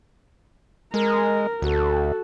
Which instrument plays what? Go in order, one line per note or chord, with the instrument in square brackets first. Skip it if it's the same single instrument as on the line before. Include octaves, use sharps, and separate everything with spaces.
[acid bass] G#3 [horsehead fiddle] A#4
[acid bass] D2 [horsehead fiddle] F#4 A4